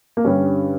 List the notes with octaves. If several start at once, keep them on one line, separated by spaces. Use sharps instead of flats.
A#3
G2 D3 G3 C#4